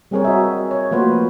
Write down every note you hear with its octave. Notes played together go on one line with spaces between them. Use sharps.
G3 C4 G#4 A#4 C#5
F#4 D#5 E5
C#5
F3 A3 A#3 F#4 B4 C5